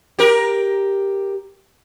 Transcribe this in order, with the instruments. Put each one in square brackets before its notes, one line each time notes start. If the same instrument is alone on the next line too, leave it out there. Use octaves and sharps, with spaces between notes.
[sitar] G4 A#4